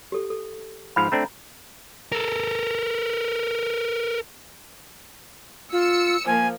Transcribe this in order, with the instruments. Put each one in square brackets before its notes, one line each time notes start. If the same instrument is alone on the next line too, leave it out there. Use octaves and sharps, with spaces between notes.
[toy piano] G4 A4
A4
[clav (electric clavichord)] G#2 F3 F5 [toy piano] B5
[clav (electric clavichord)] A3 C4 D4 [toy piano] A#5
[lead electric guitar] A4 A#4
[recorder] F4 [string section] E6 C#7
[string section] F3 A#3 [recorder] G#5